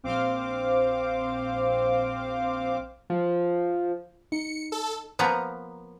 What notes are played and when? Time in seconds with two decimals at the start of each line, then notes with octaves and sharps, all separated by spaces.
0.03 A#1 C4 C5 F5 D6
3.10 F3
4.32 D#4 C#7
4.72 A4
5.19 F3 A#3 B3 A#5